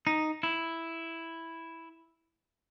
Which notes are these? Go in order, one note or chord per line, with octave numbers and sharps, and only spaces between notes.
D#4
E4